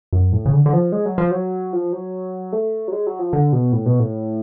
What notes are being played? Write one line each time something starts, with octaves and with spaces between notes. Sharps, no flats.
F#2
A2
C#3
D3
D3
F3
G#3
F#3
F3
F#3
F3
F#3
A3
F#3
G#3
F#3
F3
D3
B2
A2
B2
A2